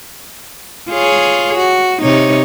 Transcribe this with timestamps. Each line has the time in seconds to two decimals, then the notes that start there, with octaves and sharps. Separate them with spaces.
0.89 F4 G#4 C#5
1.57 F#4
2.02 C3 D#4 C#5